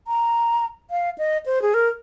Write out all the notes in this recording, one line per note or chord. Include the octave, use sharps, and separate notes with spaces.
A#5
F5
D#5
C5
G#4
A#4